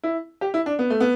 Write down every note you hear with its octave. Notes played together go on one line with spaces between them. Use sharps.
E4
G4
E4
D4
B3
A3
B3